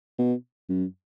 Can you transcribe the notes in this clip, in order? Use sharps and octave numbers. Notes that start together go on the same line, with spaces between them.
B2
F#2